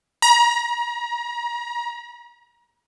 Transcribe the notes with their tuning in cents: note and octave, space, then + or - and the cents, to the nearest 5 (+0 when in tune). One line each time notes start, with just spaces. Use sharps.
A#5 +35